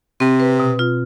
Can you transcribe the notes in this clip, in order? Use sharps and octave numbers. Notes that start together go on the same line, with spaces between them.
C3 C4
B4
B2
F4